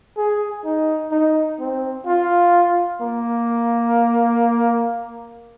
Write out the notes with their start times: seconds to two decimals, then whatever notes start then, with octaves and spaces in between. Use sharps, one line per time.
0.17 G#4
0.65 D#4
1.12 D#4
1.60 C4
2.06 F4
3.01 A#3